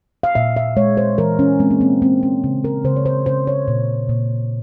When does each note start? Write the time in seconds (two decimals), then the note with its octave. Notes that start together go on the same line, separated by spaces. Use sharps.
0.23 F5
0.35 A#2 E5
0.57 E5
0.77 G#3 C#5
0.97 C5
1.18 E3 A#4
1.39 C#4
1.59 G#3 C4
1.70 A#3
1.81 C4
2.02 G#3 C4
2.23 C#4
2.44 C#3
2.64 A#4
2.84 C#3 C5
2.96 C#5
3.06 C5
3.26 C#3 C5
3.47 C#5
3.68 A#2
4.09 A#2